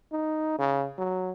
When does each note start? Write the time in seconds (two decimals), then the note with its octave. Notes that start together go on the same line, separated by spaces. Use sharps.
0.12 D#4
0.58 C#3
0.98 F#3